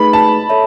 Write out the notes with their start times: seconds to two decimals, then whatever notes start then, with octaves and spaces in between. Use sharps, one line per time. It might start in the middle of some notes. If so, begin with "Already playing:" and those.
Already playing: A3 D#4 G#4 B4 B5
0.13 A5
0.49 A4 C#5 E5